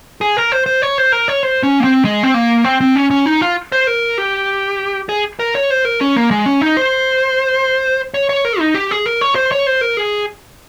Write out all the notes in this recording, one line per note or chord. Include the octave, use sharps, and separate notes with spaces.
G#4
A#4
C5
C5
C#5
C5
A#4
C#5
C5
C#4
A#3
C4
G#3
C4
A#3
C4
C4
C#4
C#4
D#4
F4
C5
A#4
G4
G#4
A#4
C#5
C5
A#4
C#4
A#3
G#3
C#4
D#4
C5
C#5
C#5
A#4
D#4
G4
G#4
A#4
C#5
C5
C#5
C5
A#4
G#4